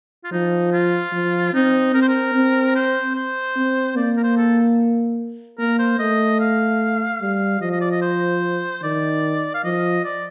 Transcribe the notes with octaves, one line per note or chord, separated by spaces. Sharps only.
F4
F3 D#4
F4
F3
C4 D#4
C4 A#4
C5
A#4
C4
C5
C5
C4
A#3 D5
A#4
C5
A4
A#3 A#4
C5
A3 D#5
F5
G3 F5
F3 D#5
D#5
D5
D#5
C5
D#3 D5
F5
F3 D#5
D5